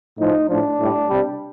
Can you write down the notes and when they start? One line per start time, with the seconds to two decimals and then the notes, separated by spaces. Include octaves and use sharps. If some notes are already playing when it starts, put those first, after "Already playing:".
0.18 A2 F3 D#4
0.48 A2 F3 D4
0.78 A2 G3
1.09 C3 G3